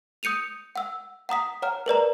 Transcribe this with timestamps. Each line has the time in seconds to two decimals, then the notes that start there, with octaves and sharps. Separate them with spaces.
0.23 D#6 G6 C#7 D#7 F7
0.76 F#5 E6
1.29 F#5 A#5 D#6 B6
1.62 C#5 F#5 A#5 F6
1.86 A#4 B4 D5 A#5